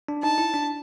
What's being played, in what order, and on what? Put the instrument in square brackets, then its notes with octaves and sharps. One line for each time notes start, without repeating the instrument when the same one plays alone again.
[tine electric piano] D4
[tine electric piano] D#4 [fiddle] A5
[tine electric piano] E4
D4